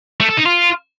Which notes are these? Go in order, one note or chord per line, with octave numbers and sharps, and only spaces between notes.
A3
A4
D#4
F4